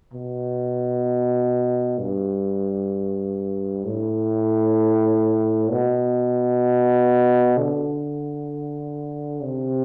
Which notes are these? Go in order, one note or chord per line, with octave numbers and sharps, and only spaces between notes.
B2
G2
A2
B2
D3
C3